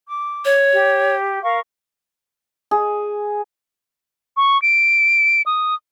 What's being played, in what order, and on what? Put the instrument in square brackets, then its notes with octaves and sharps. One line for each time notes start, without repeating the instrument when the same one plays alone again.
[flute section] D6
[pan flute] C#5
[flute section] G4
A#4 F5 C#6
[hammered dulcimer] G#4
[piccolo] C#6
D7
D#6